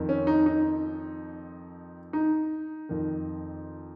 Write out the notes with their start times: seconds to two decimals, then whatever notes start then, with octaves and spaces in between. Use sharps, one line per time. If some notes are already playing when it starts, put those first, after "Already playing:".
Already playing: F2 D#3
0.09 C#4
0.27 D#4
0.46 D#4
2.13 D#4
2.89 F2 D#3